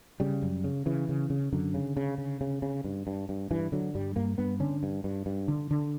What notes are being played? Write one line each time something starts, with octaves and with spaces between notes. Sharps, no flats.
C#3 G3
F#2
C#3
C#3 E3
C#3
C#3
F#2 D3
C#3
C#3
C#3
C#3
C#3
G2
G2
G2
G2 E3
D3 F#3
G2 G3
G2 A#3
G2 B3
D3 C#4
G2
G2
G2
D3
D3